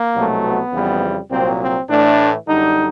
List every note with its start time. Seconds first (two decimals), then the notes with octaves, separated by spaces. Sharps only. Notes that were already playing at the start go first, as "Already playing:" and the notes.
Already playing: A#3
0.15 C2 B2 F#3 A3
0.44 B3
0.72 F2 C#3 E3 G3
1.30 C2 A#2 F#3 C4
1.60 C4
1.88 A2 E3 A3 D4
2.47 F#2 D3 G3 D#4